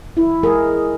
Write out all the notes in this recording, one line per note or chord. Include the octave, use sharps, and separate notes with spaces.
E4
G#3 G#4 A#4